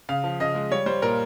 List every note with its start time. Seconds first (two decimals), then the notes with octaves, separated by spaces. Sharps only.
0.09 C#3 F5
0.24 F3
0.40 C#3 D#5
0.55 G#3
0.71 G3 C#5
0.86 G3 C5
1.02 A#2 A#4